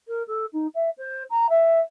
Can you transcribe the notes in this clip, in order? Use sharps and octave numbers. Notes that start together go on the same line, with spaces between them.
A#4
A4
D#4
E5
C5
A#5
E5